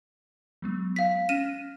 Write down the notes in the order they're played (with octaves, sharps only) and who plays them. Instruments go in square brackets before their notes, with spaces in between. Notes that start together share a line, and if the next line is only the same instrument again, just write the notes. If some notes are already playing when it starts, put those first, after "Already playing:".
[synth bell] F#3 G#3 B3
[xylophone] F5 B6
[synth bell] C#4 F6 A#6 [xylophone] D#7 E7